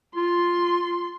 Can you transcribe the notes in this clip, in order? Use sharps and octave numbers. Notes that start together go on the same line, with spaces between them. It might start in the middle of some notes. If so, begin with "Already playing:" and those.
F4 C6